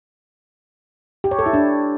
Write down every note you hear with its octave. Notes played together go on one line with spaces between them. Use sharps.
G4
C#5
A4
E4
D4